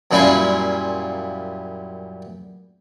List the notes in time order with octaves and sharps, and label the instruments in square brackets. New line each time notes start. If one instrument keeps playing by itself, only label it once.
[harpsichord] F#2 A#2 G3 E4 F4 G#5